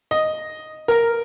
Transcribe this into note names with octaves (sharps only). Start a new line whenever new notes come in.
D#5
A#4